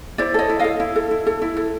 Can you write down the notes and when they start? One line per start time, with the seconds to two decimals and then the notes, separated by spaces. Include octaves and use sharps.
0.18 E4 C5 D5
0.34 A4 C#5 D#5
0.49 E4
0.59 A4 D#5 F5
0.80 E4
0.96 A4
1.11 E4
1.27 A4
1.42 E4
1.57 A4